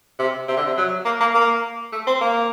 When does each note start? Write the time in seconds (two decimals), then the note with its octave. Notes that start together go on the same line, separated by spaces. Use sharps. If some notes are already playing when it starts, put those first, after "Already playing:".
0.19 C3
0.48 C3
0.57 D3
0.66 C3
0.77 F#3
1.05 A#3
1.20 A#3
1.34 A#3
1.92 A3
2.07 C4
2.21 A#3